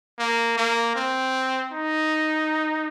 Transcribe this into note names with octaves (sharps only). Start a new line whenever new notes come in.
A#3
A#3
C4
D#4